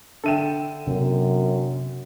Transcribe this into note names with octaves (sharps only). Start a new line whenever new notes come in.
D3 A4 E5 G5 D#7 E7
F#2 C3 B3